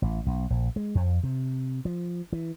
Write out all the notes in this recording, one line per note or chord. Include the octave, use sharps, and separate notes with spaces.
A1
B1
A#1
G#3
F2
C3
F3
E3